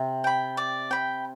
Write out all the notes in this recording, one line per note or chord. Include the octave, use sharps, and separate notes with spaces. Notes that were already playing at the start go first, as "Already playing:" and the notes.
Already playing: C3
G5 B5
D5
G5 B5